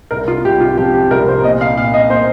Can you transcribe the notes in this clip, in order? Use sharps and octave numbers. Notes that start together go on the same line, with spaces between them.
C2 A#4
F4
C2 G4
F4
F3 G4
G4
C2 A#4
C5
A#2 D#5
F5
A#2 F5
D#5
A#3 C5